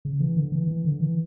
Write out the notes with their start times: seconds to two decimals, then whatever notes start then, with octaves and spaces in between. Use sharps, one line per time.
0.05 C#3
0.21 E3
0.37 D3
0.52 E3
0.68 E3
0.85 D3
1.00 E3